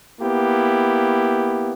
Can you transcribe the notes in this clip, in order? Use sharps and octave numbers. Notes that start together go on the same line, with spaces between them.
A#3 B3 E4 G4